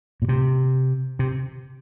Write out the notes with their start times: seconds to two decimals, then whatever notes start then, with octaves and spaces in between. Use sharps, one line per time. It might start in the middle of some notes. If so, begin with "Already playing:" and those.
0.22 A#2
0.29 C3
1.19 C3